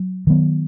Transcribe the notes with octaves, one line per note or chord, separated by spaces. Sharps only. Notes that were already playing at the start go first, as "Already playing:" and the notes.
Already playing: F#3
D#3 F#3 B3